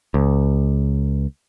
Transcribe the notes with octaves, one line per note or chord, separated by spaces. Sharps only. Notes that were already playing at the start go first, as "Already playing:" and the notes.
C#2